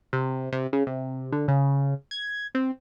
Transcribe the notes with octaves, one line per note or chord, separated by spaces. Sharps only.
C3
C3
C#3
C3
D3
C#3
G#6
C4